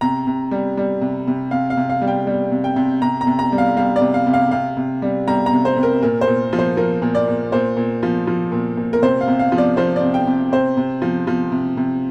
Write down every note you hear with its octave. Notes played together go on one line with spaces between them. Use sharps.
C3 A#5
C3
G3
G3
C3
C3
C3 F5
F5
C3
F5
G3
G5
G3
C3
G5
C3
C3 A#5
A#5
C3
A#5
G3
F5
G3 F5
D5
C3
F5
C3
F5
C3 F5
C3
G3
G3 A#5
A#5
C3
C5
C3
A#4
A#2 A#4
C5
A#2
F3
C5
F3 A#4
A#2
D5
A#2
A#2 C5
A#2
F3
F3
A#2
A#2
A#4
C3 C5
F5
C3
F5
F3
D5
F3 C5
D5
C3
G5
C3
C3 C5
C3
F3
F3
C3
C3